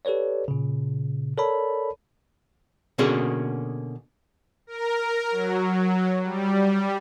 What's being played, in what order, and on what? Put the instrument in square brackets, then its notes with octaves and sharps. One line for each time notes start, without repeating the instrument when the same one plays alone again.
[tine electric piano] G4 A4 B4 C#5 D5
A#2 C#3
A4 A#4 C#5 D5 A5 B5
[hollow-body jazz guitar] B2 D3 A#3 C#4 F#4 G#4
[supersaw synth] A#4
F#3
G3